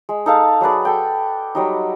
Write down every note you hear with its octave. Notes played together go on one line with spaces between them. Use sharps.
G#3
D#4 A4 F5 A5
F#3 G#4 B4 D5
A4 G5
F#3 G3 D#4